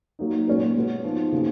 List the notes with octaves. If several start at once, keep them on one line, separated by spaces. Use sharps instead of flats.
F#3 A#3 D#4
A#2 G#3 C#4 F#4 B4
B2 G#3 B3 F#4
F3 B3 D#4
C#3 F#3 A#3 D#4 G#4